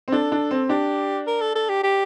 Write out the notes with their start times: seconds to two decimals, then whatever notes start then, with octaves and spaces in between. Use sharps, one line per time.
0.08 C4
0.12 D4 A4
0.32 D4
0.51 C4
0.69 D4 G4
1.27 A#4
1.41 A4
1.55 A4
1.69 G4
1.84 G4